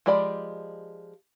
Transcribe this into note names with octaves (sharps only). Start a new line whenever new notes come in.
F3 G#3 G4 D5 B5